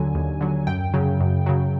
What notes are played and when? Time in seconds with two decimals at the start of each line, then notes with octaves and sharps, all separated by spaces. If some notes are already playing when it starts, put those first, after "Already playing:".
Already playing: D#2 D3 F#3 G#5
0.15 D#2
0.41 D3 F#3
0.67 F#2 G5
0.93 C#3 F#3
1.20 F#2
1.46 C#3 F#3